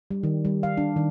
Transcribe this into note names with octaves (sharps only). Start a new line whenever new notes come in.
G3
D#3
G3
F5
D4
D#3